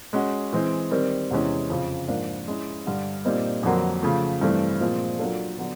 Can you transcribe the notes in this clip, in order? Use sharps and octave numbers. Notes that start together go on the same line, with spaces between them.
G#3 C#4 F#4
E3 G#3 C4
D#3 G3 C4
E2 C3 E3 G#3 C#4
F2 C#3 F3
G#2 F3 A#3 D4 F4
G#3 C#4 E4
G2 D3 G3
A#2 G3 C4 D#4
F2 D3 F#3 A#3
C#3 F3 A3
G2 E3 A3 C4
A#2 F3 G#3 C4 F4
F#3 A#3 D4 F4 A4
D3 F#3 B3